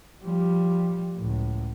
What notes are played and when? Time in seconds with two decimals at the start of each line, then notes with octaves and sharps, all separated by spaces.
0.24 F3 G3
1.14 C#2 A2